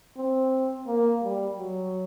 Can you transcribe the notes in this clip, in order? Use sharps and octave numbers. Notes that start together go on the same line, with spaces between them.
C4
A#3
G3
F#3